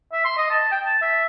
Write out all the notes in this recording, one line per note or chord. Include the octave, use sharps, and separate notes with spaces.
E5
C6
D#5
A5
G5
A5
E5